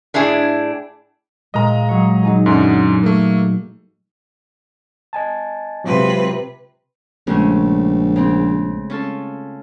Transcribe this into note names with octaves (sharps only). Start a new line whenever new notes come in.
A2 D4 E4 G#4
A#2 G#3 D#5 A#5
F#3 C#5
F#3 D#4 G#4
F#2 D3
A3 A#3
D#5 G#5 A5
C3 F#3 G#3 F4 B4
A#1 C#3 G#3 A3
C#3 C4
C#4 F4 A4